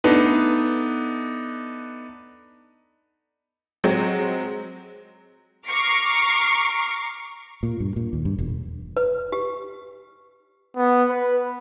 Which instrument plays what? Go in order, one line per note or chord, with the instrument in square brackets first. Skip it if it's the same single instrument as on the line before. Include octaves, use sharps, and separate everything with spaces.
[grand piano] A3 B3 D4 D#4 B4
[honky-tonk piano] F#3 G#3 C4
[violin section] A#5 C#6 D6 F6 C7
[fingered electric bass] A#2
G2
A#2
D#2
G2
E1
[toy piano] B4
G4
[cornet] B3
B4